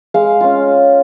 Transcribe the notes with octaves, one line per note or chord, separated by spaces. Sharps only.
G#3 F5
C#4 F4